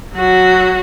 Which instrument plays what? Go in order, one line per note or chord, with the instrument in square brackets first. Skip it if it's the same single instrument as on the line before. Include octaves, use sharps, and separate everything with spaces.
[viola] F#3 F#4